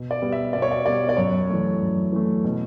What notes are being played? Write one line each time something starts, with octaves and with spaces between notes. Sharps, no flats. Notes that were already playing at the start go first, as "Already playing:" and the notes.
Already playing: B2
D5
G3 B3
E5
B2 D5
C#5
D5
G3 B3 D5
D5
F#2 C#5
E3 A3
F#2
E3 A3
B2